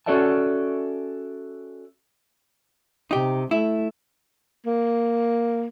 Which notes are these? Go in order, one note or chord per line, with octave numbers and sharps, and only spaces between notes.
C#4 F#4 A4 D5 E5 A5
C3 D#4 G4
A3 E4
A#3